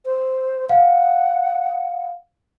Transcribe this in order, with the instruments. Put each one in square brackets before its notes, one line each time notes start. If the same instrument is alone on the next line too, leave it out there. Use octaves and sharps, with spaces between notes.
[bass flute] C5
[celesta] F5 [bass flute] F#5